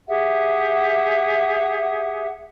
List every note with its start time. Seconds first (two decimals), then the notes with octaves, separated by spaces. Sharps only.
0.08 G4 G#4 E5 F#5